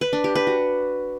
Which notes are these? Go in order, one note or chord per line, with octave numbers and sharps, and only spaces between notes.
B4
D4
G4
B4
F#4